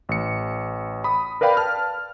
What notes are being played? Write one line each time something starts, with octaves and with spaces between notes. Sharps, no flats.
A1 C#7
B5 D#6
A#4 B4 D5 F5 G5 B5
A5 F6